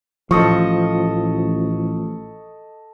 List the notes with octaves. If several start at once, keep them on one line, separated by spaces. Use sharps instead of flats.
A1 F3 A4 D#5 C#6